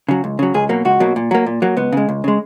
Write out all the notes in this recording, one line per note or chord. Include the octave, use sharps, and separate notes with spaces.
C#3 F#3
C#2
C#3 F#3
C#2 G#4
B2 F#3 A#3
C#2 F#4
B2 F#3 A#3
A#2
F#3 A#3
A#2
F#3 A#3
C#2 B3
C#3 G#3
C#2
C#3 G#3